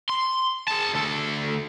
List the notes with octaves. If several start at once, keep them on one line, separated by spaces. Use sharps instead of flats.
C6
G#4 A5
D2 A4